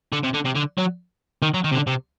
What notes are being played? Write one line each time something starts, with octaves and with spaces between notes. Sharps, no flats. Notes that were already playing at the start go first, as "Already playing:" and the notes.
D3
C3
D3
C3
D3
F#3
D#3
F#3
D#3
C3
D3
C3